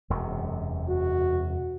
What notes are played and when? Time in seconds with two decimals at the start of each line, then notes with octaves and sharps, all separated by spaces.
0.10 E1 F#2 C3
0.89 F#4